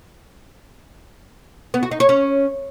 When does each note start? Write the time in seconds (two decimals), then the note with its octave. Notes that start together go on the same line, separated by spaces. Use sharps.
1.74 B3
1.83 F#4
1.91 D#4
2.00 C#5
2.09 C#4